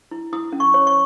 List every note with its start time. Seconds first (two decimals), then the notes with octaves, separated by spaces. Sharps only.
0.11 E4
0.33 E4 D#6
0.52 C#4
0.60 C#6
0.74 C#5
0.87 C#6